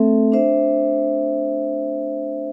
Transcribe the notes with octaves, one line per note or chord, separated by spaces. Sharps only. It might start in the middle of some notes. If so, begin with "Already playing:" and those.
Already playing: A3 C4 A4 E5
D4 C5 E5